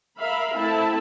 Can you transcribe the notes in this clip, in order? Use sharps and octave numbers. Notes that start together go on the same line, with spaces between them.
A#4 E5 F5 B5
A3 C4 E4 E5 A5 B5